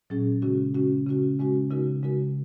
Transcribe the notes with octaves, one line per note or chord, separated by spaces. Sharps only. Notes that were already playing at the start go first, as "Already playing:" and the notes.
A#2 F#3 C#4 G#4
C#3 G#3 C#4 F#4
C#3 G#3 C#4 F#4
C#3 G#3 C#4 F#4
C#3 G#3 C#4 F#4
C#3 G#3 D#4 F#4 A#4
C#3 G#3 D#4 F#4 A#4